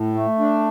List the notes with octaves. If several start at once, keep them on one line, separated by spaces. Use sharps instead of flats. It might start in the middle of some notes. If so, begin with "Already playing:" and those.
Already playing: A2
A3
D4